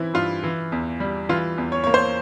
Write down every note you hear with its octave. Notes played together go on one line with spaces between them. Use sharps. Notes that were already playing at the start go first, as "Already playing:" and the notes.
Already playing: E3 C4 E4
G2 F4
E3
E2
G3
E3 F4
E2
C#5
A#3 C#5
C5